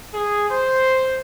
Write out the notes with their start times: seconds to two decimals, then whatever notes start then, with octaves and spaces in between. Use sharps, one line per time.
0.13 G#4
0.50 C5